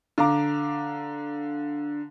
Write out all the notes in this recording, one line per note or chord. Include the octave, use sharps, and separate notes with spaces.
D3 F5 A#5 D6